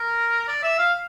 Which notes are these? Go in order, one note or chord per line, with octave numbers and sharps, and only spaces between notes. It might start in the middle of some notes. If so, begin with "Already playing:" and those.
Already playing: A#4
D5
E5
F5